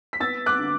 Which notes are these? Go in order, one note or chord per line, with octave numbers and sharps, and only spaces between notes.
B6
B3 E6 A6
D6 F#6
D3